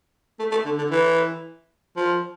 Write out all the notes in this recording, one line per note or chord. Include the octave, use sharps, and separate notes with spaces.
A3
A3
D3
D3
E3
F3